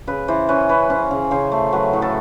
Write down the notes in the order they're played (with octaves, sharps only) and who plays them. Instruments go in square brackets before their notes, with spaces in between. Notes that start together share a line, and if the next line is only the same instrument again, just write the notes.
[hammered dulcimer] C#3 B4
E3 C5
C#4 B4
C#4 B4
C#4 C5
C#3
C#3 C5
A3
F#3 B4
A2
A4